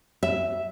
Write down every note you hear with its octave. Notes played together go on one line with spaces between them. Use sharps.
E5